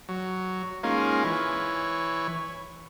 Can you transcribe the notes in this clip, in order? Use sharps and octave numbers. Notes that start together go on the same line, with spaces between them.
F#3
G#3 A#3 C#4 D#4 F4
E3 C#5